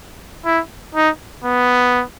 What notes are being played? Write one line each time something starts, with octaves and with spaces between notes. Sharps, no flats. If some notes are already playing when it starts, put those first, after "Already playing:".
E4
D#4
B3